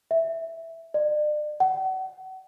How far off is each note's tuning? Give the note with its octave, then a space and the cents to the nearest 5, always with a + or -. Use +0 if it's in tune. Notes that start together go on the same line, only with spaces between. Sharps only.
E5 +0
D5 +40
F#5 +30